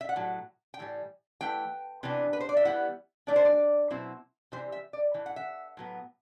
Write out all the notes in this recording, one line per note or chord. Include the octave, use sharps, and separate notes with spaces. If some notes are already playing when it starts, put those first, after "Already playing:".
E5
F#5
A2 F#3
G5
A2 E3 G3
E3 A3 G5
C3 E3 B3 D4
B4
C5
D5
E5
E3 G3 B3 E4 F#5
E3 A3 D4 D5
C5
D5
B2 F#3 C4 E4
C3 E3 G3 C5
E5
D5
A2 E3
F#5
E5
A2 F#3 B3